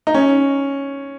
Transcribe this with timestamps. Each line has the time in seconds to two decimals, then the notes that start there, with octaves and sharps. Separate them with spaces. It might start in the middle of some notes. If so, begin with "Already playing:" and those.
0.07 D#4
0.14 C#4